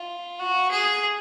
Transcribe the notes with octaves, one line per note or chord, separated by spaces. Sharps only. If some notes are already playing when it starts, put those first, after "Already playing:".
Already playing: F4
F#4
G#4